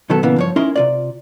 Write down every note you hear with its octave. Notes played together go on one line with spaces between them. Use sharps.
B1 D#3 F#3 B3 A4
A#2 C#3 E3 A#3 B3
G2 F3 C#5
C#4 D#4 E4 A#4 C6
C3 F4 D5